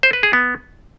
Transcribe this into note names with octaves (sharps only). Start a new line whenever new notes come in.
C5
B4
G#4
B3